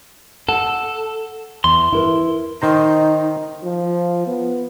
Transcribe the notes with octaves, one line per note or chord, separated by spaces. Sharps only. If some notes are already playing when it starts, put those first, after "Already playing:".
A4 F#5
E2 C6
E4 A#4 B4
D#3 D#4 C5 A#5
F3
B3